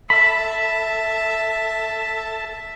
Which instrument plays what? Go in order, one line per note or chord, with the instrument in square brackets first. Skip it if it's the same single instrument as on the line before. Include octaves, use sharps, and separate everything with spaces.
[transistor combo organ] A4 A5 [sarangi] E5 [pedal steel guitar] B5